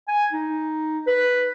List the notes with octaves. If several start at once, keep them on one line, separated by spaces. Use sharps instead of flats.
G#5
D#4
B4